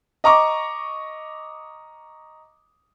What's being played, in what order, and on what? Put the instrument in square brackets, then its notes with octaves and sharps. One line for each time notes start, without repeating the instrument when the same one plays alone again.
[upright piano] D#5 A#5 C#6 D6